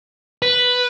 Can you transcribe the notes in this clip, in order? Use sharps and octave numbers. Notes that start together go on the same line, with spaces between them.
B4